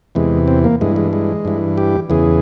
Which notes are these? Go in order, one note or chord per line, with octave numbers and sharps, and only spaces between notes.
E2 C3 E3 G#3
C4
A#3
G2 E3 G#3
G#3
G#3
G2 E3
G4
E2 C#3 E3 G#4